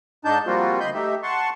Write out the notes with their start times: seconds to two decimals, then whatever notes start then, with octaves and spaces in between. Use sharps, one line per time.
0.25 G#2 D4 D#4 A5 G6
0.46 F3 G3 A#3 C4 F4 F#4
0.80 D2 D#5 B5 C6 G6
0.94 A3 D#4 G4 E5
1.23 F#5 A5 C6 C#6